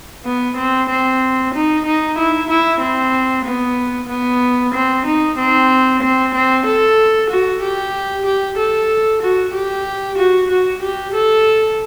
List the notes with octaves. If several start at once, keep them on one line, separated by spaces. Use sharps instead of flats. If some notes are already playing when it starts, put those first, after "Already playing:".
B3
C4
C4
D#4
D#4
E4
E4
C4
B3
B3
C4
D#4
C4
C4
C4
A4
F#4
G4
G4
A4
F#4
G4
F#4
F#4
G4
A4